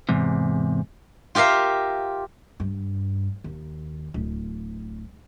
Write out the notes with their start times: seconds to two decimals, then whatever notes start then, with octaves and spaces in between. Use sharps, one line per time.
0.09 E2 G#2 C3
1.35 F4 G4 A#4 E5 F5
2.60 G2
3.44 D#2
4.14 D1